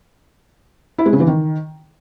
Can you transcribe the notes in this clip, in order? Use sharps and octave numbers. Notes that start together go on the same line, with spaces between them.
E4
G#3
C#3
E3
D#3